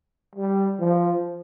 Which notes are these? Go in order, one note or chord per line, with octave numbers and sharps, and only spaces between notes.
G3
F3